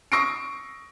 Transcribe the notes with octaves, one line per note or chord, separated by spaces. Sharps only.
C#6 D#6 E6 A#6 C7 D7